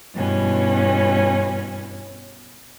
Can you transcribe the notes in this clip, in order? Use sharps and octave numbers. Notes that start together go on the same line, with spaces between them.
G2 B2 E3 C#4